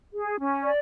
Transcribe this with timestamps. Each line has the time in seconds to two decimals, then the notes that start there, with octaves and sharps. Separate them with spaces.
0.13 G#4
0.40 C#4
0.64 D5